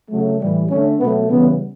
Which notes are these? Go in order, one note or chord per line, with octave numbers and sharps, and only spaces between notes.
C#3 F#3 A3
A2 E3 G3
D3 A3 C#4
B2 F#3 A3 B3
C#3 E3 G3 B3